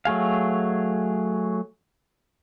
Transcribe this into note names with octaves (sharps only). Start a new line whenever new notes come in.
F#3 A3 G#4 F5